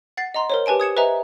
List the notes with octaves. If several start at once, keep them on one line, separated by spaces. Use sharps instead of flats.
F#5 A6 C7
D#5 F#5 A#5 C6
A#4 C5 C#5
G4 B4 G#5 A5 D7
D#6 G#6 C#7 E7
B4 C5 D#5 E5 G#5 A#5